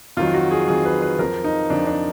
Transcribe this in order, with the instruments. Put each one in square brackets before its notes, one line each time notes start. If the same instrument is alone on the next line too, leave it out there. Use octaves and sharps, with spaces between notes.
[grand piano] F2 D#3 F#3 F4
F#4
G#4
F2 D#3 F#3 G#4
B4
B4
F2 F3 A#4
D#4
F2 F3 D4
D4